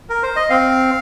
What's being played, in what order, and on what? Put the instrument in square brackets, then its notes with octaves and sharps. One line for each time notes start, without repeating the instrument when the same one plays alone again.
[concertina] A#4
C5
D#5
C4 F5